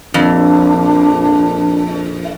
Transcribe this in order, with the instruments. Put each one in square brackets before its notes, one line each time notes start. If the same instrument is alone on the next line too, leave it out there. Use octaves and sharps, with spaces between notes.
[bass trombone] A#1 [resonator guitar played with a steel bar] F2 [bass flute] D4